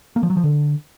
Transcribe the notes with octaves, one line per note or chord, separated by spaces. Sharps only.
A#3
F3
F#3
F3
D3